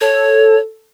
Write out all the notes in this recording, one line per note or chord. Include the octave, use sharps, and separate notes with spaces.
A4 C#5